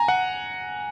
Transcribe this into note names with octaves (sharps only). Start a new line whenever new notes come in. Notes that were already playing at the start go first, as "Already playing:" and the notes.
Already playing: G#5 A#5
F#5